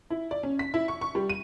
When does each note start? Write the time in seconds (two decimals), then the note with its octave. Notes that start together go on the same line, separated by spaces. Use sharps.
0.10 E4
0.31 D5
0.43 C#4
0.59 B6
0.74 E4
0.88 C#6
1.01 C#6
1.15 G3
1.30 D#7